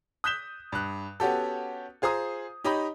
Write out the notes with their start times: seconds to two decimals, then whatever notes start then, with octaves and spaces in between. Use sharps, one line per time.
0.24 D#6 F#6 G6 B6 E7 G7
0.72 G2 F#6
1.20 B3 C#4 F#4 G4 A4
2.02 F4 G#4 C5 A#5 D#6
2.64 D#4 G4 C#5 D#5 A#5 B5